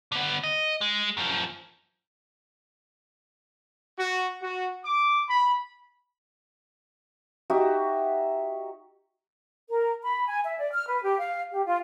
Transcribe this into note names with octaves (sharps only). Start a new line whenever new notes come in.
D3 B3
D#5
G#3
F#2 F3
F#4
F#4
D6
B5
D#4 F#4 G4 E5
A#4
B5
G#5
E5
D5
F6
B4
G4
F5
G4
F4